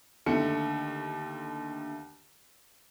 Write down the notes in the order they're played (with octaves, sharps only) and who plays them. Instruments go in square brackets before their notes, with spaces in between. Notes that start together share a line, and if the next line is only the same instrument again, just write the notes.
[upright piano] D#2 D3 A3 C#7